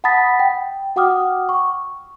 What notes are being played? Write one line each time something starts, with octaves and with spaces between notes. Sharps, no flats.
F#5 A5 B5 D#6 A6 B6
G5
F#4 F#5 G5 D6 D#6 F6
C#6